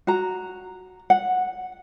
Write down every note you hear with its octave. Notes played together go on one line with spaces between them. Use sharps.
F#4 A#5
F#5